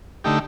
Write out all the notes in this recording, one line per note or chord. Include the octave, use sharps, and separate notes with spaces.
D3 A3 D#4 G4